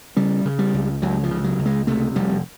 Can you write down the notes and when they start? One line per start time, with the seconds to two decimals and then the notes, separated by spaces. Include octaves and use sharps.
0.16 C#3 G3
0.45 C#3
0.59 G3
0.74 C#2
1.02 C#2 F#3
1.23 F3
1.31 C#3
1.44 F#3
1.59 C#2
1.66 G#3
1.87 C3 A3
2.16 F1 G3